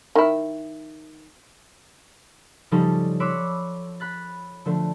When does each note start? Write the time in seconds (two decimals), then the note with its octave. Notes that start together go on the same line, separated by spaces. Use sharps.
0.15 D#3 E4
2.71 C#3 F3 G3 C#4 D#4 A4
3.20 C#5 B5 C6 D6 E6 F#6
4.00 B5 F#6 A6
4.65 D3 F3 A3